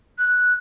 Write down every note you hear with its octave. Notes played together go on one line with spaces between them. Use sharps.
F#6